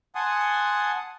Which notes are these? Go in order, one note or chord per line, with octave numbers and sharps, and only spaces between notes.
F#5 G#5 A5 C6 D#6